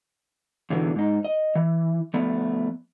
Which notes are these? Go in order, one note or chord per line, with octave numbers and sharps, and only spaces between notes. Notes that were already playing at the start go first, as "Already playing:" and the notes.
E2 B2 D3 E3
G#2 D#4
D#5
E3
F3 A3 B3